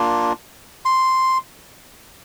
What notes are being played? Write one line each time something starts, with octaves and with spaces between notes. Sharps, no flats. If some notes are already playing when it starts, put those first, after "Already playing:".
Already playing: A#3 D4 F4
C6